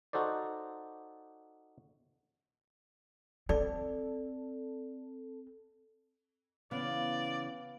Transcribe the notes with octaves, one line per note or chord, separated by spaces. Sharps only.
D#4 F#4 A4 C5 D5
C4 A4 D5
C#3 E3 B3 C#4 D5 F5